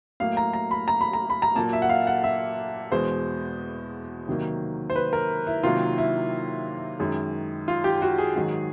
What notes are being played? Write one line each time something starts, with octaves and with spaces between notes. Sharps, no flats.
A2 F#3 A#3 F5
A#5
A#5
B5
A#5
B5
A#5
B5
A#5
A#2 F#3 A#3 A5
E5
F#5
F5
F#5
E5
E2 B2 G#3 C5
C3 D#3 F#3 A#3
C5
B4
A#4
E4
C3 D#3 F#3 A#3 F4
E4
F#2 D#3 G#3
F4
G4
F#4
G#4
G#2 D#3 F#3